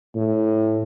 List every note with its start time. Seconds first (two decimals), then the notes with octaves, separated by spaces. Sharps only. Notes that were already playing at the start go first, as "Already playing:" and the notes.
0.15 A2